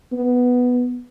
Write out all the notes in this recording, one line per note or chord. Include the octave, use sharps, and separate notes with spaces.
B3